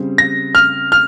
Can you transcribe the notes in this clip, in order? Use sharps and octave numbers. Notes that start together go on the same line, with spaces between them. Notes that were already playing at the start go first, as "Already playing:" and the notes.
Already playing: C#3 G3 C4
A#6
F6
F6